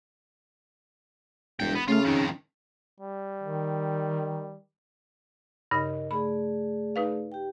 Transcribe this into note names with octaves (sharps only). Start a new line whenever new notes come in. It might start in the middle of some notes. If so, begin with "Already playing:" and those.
E1 G2 G5
B3
C#3 A3 F4 F5
F2 D#3 D#4
G3
D#3
G2 C#3 D#4 A#4 D#5
A3 G#4 D5 B5
D#4 B4 F5
G4 G5